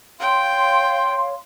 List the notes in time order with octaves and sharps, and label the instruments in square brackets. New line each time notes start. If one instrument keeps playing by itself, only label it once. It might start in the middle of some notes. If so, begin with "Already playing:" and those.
[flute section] C#5 F5 C6 [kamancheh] G5